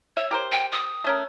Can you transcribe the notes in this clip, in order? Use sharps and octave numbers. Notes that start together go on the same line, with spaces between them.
C#5 E5
G4 A#4 C5
G5
D#6
A3 C#4 A#4